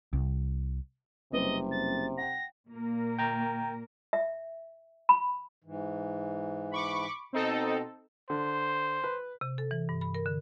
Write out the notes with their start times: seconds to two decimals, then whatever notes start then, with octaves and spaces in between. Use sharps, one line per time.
0.13 C2
1.32 F#1 C3 G3 C4 B4 D#5
1.71 A6
2.18 F#5 G5 A#6
2.69 A#2 A#3 A#4
3.19 G5 A#5
4.13 E5
5.09 B5
5.64 G#2 E3
6.71 B5 C#6 D6
7.33 B2 C4 D#4 A4
8.30 D3 C5
9.04 B4
9.41 C3
9.58 A4
9.71 E3
9.89 G2
10.01 B5
10.15 A#4
10.26 D3